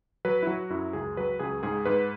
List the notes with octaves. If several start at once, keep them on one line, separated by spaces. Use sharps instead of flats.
F#3 B4
E4
F#3 F#4
F#2 E4
C#2 G#4
F#3 B4
C#2 G#4
G#2 G#4
G#2 B4